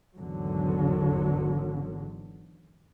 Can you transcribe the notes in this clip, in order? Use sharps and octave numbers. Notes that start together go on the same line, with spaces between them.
G#1 E2 D3 F#3